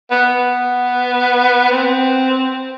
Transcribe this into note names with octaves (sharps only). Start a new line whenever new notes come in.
B3
C4